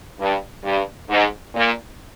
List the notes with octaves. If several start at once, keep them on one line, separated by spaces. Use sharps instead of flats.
G2
G2
G#2
A#2